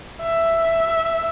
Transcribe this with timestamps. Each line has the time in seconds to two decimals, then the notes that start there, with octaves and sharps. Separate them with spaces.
0.22 E5